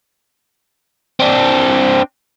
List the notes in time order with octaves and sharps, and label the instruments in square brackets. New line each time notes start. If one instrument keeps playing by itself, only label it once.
[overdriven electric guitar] C4 D4